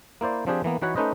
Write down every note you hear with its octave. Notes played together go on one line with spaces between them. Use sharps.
A#3 E4 C5 D5
F3 C4 D4 G4 G#4
E3 A#3 B3
E3 D#4 F#4 B4 C#5 F#5
A3 C#4 D#4 B4 C5 D#5